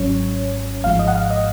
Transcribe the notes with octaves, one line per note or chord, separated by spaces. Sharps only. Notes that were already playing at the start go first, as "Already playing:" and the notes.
Already playing: G#1 G#2 F#3 C#4 C#5
G#1 G#2 F3 G#3 F5
D#5
F#5
F5
D#5